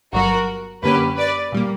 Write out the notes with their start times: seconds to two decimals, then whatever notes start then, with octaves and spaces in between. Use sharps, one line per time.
0.13 G1 G2 F#3 F#4 A#4
0.83 F#2 D3 A#3 C#4 G4 B4
1.17 B4 D5
1.52 A#2 G3 A#3